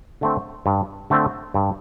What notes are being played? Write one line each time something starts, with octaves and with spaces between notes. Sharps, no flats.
D3 A3 C4
G2
D3 A3 C4
G2